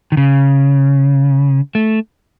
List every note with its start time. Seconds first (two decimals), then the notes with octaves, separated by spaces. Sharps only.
0.12 D#3
0.17 C#3
1.75 A3